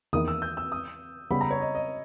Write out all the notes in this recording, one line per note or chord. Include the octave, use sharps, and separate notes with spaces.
E2 D#3 A#3 E4 D#6
E6
G6
E6
D#6
C#3 G3 B3 G4 B5
A#5
C#5
D#5
D#5